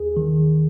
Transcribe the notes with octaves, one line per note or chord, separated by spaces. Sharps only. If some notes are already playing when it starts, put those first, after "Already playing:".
Already playing: D#2 G#4
D#3